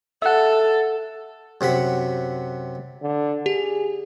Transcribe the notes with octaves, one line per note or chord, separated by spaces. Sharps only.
A4 E5 F#5
F#2 C3 F#5 B5
D3
G4 G#4